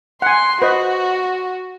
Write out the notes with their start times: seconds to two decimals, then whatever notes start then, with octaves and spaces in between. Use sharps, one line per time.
0.22 F#5 G#5 C6
0.62 F#4 B4 C5 D#5